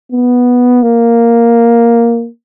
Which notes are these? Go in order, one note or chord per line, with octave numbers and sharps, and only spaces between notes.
B3
A#3